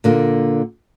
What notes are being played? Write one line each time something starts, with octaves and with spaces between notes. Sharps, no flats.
A#2 D3 A#3